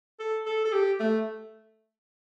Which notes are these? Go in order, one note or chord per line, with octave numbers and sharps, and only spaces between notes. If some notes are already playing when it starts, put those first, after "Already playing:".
A4
A4
A4
G4
A3